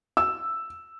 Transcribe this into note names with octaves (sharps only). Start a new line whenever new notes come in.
E6